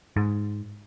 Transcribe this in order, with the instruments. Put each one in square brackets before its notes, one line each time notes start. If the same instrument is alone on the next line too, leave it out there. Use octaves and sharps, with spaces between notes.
[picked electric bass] G#2